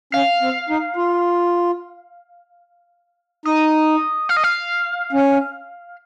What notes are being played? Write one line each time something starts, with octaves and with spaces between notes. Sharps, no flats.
C#4 F5
C4
D#4
F4
D#4 D#5
F5
D#5
F5
C#4